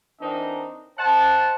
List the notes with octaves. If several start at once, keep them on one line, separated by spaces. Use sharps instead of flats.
E3 C4 D4 D#4 A#4 D#5
C5 D#5 F#5 A5